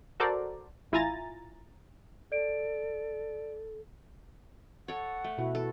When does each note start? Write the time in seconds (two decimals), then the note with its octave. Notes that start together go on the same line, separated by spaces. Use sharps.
0.20 F#4 A4 A#4 C5 D5
0.92 A1 E4 F4 G#5 A#5 A6
2.32 A4 D5 D7
4.88 A4 C#5 F#5
5.24 A3
5.38 B2 E4 F#4
5.55 A4